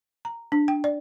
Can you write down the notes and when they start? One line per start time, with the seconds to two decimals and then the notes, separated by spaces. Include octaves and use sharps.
0.25 A#5
0.52 D4
0.68 G5
0.84 D5